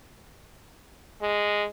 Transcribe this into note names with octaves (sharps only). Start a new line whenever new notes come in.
G#3